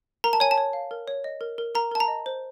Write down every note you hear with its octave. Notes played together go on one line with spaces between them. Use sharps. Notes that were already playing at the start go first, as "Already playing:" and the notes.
A#4 A#5
A5
C#5 G#5
A5
C#5
F5
A#4
C#5
D#5
A#4
A#4
A#4 A#5
A#4 A5
A#5
D#5
C5